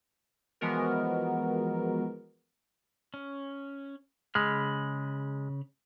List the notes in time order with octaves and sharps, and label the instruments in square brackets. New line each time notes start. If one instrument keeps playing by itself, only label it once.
[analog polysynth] E3 F3 G#3 B3 F#4 A#4
[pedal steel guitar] C#4
[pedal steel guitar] C#3 B5 F6 [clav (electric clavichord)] G#3